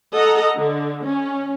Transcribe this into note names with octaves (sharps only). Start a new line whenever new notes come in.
A4 D#5 F#5 A#5
D3
C#4